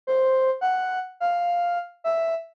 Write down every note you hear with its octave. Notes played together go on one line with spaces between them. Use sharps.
C5
F#5
F5
E5